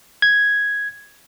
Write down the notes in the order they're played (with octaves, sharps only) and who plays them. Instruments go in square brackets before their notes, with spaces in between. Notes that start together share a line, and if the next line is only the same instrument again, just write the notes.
[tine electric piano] G#6